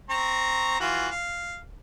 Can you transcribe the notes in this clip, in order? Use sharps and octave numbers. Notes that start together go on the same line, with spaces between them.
C4 A#5 C#6
E3 F4 F#4
F5